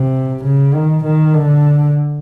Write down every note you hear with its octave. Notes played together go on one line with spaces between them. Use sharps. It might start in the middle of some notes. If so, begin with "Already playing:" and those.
Already playing: C3
C#3
D#3
D#3
D3